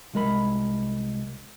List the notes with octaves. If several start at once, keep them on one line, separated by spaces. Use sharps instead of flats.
C2 G#3 A#4 B5